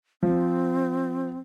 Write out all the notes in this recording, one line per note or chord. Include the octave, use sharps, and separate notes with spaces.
F3 C4